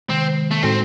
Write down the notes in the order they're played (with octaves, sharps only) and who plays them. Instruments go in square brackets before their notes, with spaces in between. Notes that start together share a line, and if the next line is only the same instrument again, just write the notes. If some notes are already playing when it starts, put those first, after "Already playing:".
[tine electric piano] C3 D#3 G#3 [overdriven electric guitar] C4
[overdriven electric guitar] A3
[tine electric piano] A2 G#3 D#4 F#4 A4 [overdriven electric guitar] C4